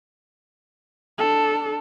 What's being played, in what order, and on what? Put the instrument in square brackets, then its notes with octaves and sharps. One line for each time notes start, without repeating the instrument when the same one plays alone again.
[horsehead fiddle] D4 A4